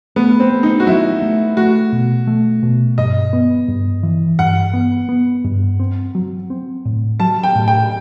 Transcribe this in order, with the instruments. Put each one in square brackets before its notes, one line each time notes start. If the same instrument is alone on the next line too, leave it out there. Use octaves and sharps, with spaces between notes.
[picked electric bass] A3 [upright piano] B3
[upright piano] C4
[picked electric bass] A3
[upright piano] D#4
F#4
[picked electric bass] F#3 [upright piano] E4
[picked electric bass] A3
[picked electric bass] A3 [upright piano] F#4
[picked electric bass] B2
A3
B2
[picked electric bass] G2 [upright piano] D#5
[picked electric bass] B3
G2
E3
[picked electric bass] G2 [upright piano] F#5
[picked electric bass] B3
B3
G2
C4
F#3
C4
A2
[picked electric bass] F#3 [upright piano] A5
[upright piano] G5
[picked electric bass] A2
[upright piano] G5